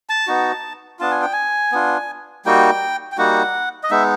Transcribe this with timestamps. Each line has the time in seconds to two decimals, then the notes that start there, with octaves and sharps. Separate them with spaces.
0.10 A5
0.27 B3 D#4 F#4
0.99 B3 D4 F4 A5
1.11 G#5
1.22 G5
1.33 G#5
1.72 B3 D4 F4
2.45 G3 A#3 D#4 F#4 G5
3.12 G5
3.18 G3 A#3 D#4 F#4 F#5
3.83 D#5
3.91 G#3 B3 D#4 E5